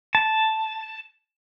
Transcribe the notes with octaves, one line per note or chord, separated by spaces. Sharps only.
A5